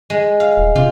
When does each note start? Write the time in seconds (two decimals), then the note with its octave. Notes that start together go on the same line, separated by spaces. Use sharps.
0.10 G#3
0.40 F5
0.57 D#1
0.75 C3 F4